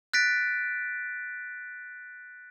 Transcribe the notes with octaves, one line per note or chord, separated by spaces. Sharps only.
F#6 A6 B6 D7